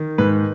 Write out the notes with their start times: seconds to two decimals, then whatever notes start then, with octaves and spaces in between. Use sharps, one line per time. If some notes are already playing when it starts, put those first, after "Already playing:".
Already playing: D#3
0.18 G#2 B4